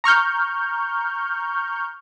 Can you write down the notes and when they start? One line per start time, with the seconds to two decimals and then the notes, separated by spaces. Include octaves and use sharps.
0.04 A#5 C#6 F6 G6